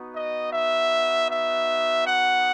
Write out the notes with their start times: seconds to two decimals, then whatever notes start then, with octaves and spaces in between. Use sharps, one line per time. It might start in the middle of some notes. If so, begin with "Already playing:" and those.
Already playing: B3 D#4 F#4
0.16 D#5
0.53 E5
1.31 E5
2.08 F#5